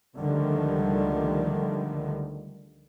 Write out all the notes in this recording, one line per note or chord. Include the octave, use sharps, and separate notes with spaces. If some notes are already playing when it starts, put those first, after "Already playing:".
C#2 D3 D#3 F3 G3 A3